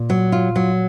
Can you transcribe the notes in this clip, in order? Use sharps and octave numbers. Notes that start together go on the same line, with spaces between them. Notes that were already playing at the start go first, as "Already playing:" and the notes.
Already playing: A#2
F#3
F4
F#3